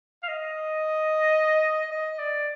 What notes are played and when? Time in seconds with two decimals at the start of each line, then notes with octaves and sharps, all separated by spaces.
0.23 F5
0.28 D#5
1.91 D#5
2.19 D5